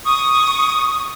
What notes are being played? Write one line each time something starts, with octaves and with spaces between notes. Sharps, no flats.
C#6 D#6